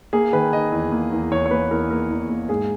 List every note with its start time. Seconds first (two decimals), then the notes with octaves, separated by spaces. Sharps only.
0.13 A#3 G#4
0.33 D#3 B4
0.53 D#3 D#5
0.72 E2
0.92 A#3
1.12 E2
1.32 E2 C#5
1.46 C#5
1.51 A#3 B4
1.71 E2 A#4
1.91 A#3 A#4
2.10 E2
2.30 A#3
2.49 G#2 G#4